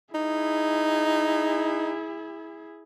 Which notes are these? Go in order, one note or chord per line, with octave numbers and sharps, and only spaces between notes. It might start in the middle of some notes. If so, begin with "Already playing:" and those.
D#4 E4 G#4